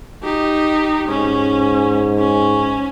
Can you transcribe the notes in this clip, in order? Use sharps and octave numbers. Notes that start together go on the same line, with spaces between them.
D#4 G4
G#2 C#4
C#4